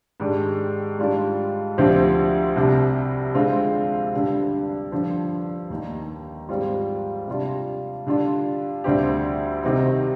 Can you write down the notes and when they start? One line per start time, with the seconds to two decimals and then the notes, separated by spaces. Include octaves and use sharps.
0.20 G#2 D#3 G#3 D4 G4
0.99 G#2 G3 D4 F4
1.78 D2 D3 F3 C4 G4
2.55 C2 C3 G3 D4
3.34 D3 G#3 C4 F4
4.13 G2 D3 G3
4.92 G2 D3 F3
5.70 D#2 D#3 A#3
6.49 G#2 G3 C4 F4
7.28 C3 G3 D4 F4
8.07 D3 G3 D4 F4
8.84 D2 D3 G3 C4 G4
9.63 C3 D#3 G3 C4 D#4